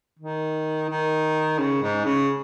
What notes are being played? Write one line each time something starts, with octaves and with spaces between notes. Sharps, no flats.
D#3
D#3
C#3
G#2
C#3